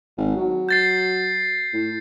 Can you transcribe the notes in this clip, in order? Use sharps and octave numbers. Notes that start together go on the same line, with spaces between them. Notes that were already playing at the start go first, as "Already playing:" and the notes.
G#1
F#3
G6 A6 C7
A2